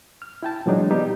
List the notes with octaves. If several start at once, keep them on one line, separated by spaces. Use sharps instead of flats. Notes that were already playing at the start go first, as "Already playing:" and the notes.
F6
E4 G5 A5
A#2 E3 F#3 G#3 D4 D#4
G3 B3 D#4 G4